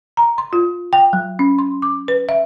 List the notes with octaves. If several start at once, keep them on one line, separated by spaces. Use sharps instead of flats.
A#5
C6
F4
G5
F#3
C#4
C6
D6
B4
E5